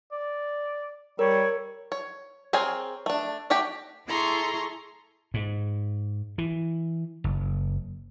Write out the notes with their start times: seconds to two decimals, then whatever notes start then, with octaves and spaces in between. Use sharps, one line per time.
0.12 D5
1.19 G3 A#4 C#5
1.92 C#5
2.53 C4 G#4 A#4 C#5 G#5
3.06 A3 D4
3.50 A3 F#4 G4 G5
4.08 E4 G#4 A4 A#5 C6 C#6
5.34 G#2
6.38 E3
7.24 F#1